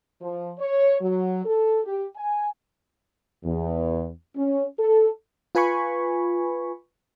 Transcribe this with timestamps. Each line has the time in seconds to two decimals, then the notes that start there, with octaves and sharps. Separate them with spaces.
0.22 F3
0.59 C#5
1.01 F#3
1.45 A4
1.85 G4
2.17 G#5
3.45 E2
4.37 C#4
4.79 A4
5.55 F4 B4 G#5 B5 C#6